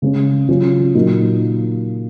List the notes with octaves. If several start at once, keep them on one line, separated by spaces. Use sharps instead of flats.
C#3 G#3 C#4
C#3 F#3 C#4 F4
A#2 F#3 A#3 D#4